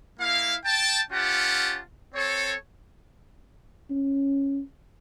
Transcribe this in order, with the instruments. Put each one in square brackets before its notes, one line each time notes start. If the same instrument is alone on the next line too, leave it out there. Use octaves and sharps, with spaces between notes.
[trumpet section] A#3 E4 F5
G5 A5
C#4 F4 G4 F#5 A5
C4 A4 C#5
[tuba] C#4